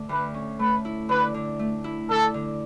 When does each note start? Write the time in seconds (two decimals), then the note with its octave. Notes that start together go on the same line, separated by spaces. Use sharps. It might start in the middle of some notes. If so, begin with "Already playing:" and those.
Already playing: D3 A3
0.09 D2 B4
0.34 C#4
0.59 A3 B4
0.85 E4
1.09 D3 B4
1.34 D3
1.59 A3
1.84 E4
2.09 D3 A4
2.34 D3